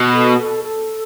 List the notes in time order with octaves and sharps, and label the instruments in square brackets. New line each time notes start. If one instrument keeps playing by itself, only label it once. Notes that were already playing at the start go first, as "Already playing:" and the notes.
Already playing: [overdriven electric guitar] B2
[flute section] A4
A4
A4